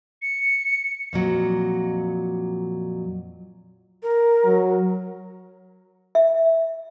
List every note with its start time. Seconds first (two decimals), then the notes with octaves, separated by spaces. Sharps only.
0.22 C#7
1.13 F2 A#2 F#3
4.03 A#4
4.45 F#3
6.15 E5